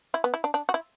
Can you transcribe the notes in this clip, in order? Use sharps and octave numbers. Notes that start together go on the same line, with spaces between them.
E4
B3
E4
D4
D4
F#4
E4